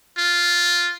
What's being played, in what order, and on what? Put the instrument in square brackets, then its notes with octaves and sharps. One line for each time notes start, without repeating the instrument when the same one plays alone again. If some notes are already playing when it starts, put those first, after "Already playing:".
[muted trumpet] F4